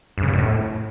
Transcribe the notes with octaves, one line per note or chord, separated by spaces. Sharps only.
G2
C#3
B2
F#2
A2